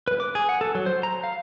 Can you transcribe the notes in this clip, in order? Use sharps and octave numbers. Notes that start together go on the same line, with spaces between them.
B4
D6
G#4
F#5
A4
F#3
C5
A#5
F5